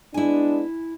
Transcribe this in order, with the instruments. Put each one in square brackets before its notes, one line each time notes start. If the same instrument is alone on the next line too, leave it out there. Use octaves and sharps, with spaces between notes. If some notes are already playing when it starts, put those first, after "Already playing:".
[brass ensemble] G#3 B3 D4 [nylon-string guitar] E4 G#5